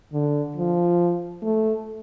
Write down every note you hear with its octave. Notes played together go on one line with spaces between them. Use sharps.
D3
F3
A3